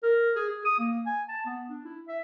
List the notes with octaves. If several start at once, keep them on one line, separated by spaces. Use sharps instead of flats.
A#4
G#4
G#4
D#6
A#3
G#5
A5
B3
D4
E4
E5